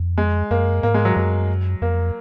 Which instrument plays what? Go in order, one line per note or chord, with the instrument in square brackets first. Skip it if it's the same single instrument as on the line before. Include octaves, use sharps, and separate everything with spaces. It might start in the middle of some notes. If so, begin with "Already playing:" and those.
Already playing: [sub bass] F2
[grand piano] G#3
[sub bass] F#2 [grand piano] A#3
[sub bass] G#2 [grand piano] A#3
[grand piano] G#3
F#3
[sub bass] F#2 [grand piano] F#3
[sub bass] F2 [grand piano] A#3